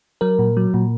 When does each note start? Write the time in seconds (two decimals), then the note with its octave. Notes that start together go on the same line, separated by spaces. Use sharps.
0.21 F#3 A#4
0.39 A#2
0.57 F#3
0.74 A#2